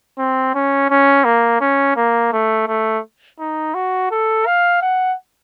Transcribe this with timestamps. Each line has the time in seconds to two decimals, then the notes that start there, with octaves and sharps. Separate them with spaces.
0.18 C4
0.54 C#4
0.90 C#4
1.25 A#3
1.61 C#4
1.96 A#3
2.33 A3
2.67 A3
3.40 D#4
3.74 F#4
4.11 A4
4.46 F5
4.82 F#5